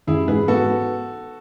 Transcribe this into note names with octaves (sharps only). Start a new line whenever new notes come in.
A1 E4 G#4
G#2 G#4 B4
B3 F#4 A4